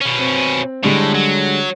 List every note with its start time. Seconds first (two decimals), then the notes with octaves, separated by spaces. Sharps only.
0.01 B2 C#4
0.19 C4
0.83 A2 D3 G3 G#3
1.14 F#3